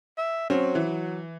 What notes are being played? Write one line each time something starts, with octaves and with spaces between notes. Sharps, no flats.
E5
F#3 C4 C#4
E3